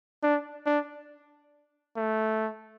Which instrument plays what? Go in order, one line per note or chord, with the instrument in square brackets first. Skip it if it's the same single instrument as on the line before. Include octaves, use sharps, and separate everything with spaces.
[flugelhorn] D4
D4
A3